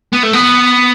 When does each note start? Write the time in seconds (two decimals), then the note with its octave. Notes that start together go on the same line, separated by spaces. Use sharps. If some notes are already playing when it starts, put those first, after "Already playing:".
0.13 B3
0.23 A3
0.33 B3